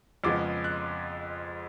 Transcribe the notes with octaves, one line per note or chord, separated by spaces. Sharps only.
F2 C#3 F3 G#3 B3 D6
F#6